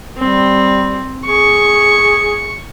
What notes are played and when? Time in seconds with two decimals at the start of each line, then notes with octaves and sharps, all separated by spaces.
0.18 G3 C4
1.25 G#4 C#6